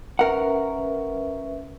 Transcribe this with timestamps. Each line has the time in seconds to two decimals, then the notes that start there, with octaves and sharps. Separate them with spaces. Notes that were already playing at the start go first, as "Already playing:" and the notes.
0.19 C#4 A#4 B4 E5 F#5